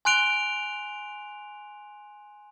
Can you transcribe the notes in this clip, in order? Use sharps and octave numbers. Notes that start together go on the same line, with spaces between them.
G#5 C6 F#6 D7 F7 G7